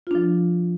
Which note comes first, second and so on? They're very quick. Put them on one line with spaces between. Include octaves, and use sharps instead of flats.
F4 D4 F3